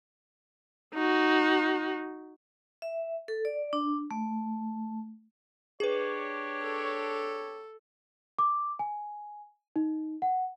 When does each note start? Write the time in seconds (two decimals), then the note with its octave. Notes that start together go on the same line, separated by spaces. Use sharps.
0.94 D#4 F#4
2.82 E5
3.28 A4
3.45 D5
3.73 D4
4.11 A3
5.80 D4 G4 G#4 B4 C#5
6.62 A4
8.39 D6
8.79 G#5
9.76 D#4
10.22 F#5